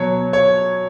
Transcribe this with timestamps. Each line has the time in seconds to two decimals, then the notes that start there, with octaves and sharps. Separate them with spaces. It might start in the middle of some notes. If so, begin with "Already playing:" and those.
Already playing: B2 F#3 C#5
0.33 C#5